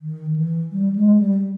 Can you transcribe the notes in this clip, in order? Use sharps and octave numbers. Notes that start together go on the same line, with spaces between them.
D#3
E3
G3
G#3
G3